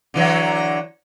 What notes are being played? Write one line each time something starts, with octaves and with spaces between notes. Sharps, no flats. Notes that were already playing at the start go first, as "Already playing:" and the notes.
D3 E3 F#3